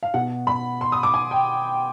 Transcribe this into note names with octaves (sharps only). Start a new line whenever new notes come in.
F5
B2 F#5
B5
C6
D#6
D6
G#5
G5